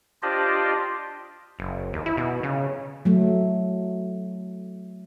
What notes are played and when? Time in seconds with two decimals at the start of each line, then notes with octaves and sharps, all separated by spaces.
0.23 D4 F4 G4 C5 D5 D#5
1.59 F#1
1.93 D#2
2.06 E4
2.17 B2
2.43 C#3
3.05 F#3 A3